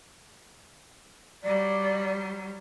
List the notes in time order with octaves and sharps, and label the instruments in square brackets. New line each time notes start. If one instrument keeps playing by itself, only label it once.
[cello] F#3 G3 [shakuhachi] D5